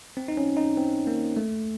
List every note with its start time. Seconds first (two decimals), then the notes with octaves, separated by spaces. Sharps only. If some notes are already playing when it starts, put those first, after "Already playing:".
0.17 C4
0.28 D#4
0.37 C#4
0.57 D#4
0.77 C4
1.07 A#3
1.37 A3